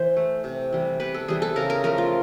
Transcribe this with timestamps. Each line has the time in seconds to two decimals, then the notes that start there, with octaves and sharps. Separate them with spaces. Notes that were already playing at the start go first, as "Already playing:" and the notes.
Already playing: E3 C5
0.16 A3
0.44 C3
0.73 E3 G3
1.00 C3 B4
1.14 A4
1.28 E3 G3 G#4
1.42 A4
1.56 C#3 A#4
1.70 A#4
1.84 F3 A3 A#4
1.98 F4